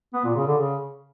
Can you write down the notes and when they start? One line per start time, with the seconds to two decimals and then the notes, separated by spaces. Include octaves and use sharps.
0.13 B3
0.25 A#2
0.36 C#3
0.47 D3
0.58 C#3